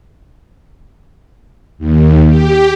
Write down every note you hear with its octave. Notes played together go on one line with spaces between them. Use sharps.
D#2
G4